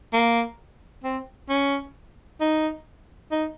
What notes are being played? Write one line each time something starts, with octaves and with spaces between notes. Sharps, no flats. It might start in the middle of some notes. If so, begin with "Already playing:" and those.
A#3
C4
C#4
D#4
D#4